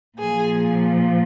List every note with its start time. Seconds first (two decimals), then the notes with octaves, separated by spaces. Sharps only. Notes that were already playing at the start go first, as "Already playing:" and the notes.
0.18 A#2 F3 G#4